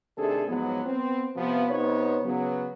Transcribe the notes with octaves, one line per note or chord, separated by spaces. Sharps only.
C3 D#3 A3 D4 G#4 A4
G#2 F3 F#3 B3
B3 C4
C3 F3 B3
C3 B3 D#4 C5 C#5
C#3 F#3 B3